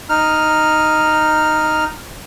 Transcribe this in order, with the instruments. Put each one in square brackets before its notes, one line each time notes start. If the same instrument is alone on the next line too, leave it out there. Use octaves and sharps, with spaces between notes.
[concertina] D#4 F6